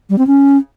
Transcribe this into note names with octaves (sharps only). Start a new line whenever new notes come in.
G3
C4
C#4